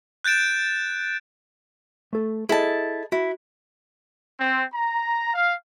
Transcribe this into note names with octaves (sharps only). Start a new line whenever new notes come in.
F#6 G6 A6 D7 E7
A3 A4
E4 G#4 A4 D#5 A5
E4 F#4
C4
A#5
F5